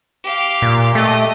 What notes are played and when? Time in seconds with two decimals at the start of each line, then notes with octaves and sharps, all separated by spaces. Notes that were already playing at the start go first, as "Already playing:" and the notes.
0.24 G4 F5
0.62 A#2
0.95 A3 G4 D#5